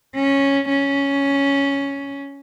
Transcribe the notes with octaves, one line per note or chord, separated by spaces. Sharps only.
C#4
C#4